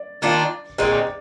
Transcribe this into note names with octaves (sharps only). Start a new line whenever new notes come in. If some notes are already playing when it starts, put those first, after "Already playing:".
Already playing: D5
D#3 A#3 D4 F4
A#2 G#3 C4 D5